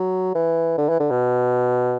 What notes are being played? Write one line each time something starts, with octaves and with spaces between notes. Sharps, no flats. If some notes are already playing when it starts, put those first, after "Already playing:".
Already playing: F#3
E3
D3
E3
D3
B2